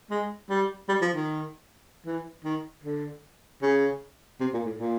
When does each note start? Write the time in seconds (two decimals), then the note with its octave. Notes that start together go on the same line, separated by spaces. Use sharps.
0.10 G#3
0.49 G3
0.89 G3
1.01 F3
1.14 D#3
2.06 E3
2.44 D#3
2.84 D3
3.62 C#3
4.40 C3
4.53 A#2
4.65 A2
4.79 A#2